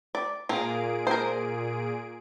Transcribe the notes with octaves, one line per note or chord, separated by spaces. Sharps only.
D5
A#2 F4 G#4 A#4 D7
A#4 C5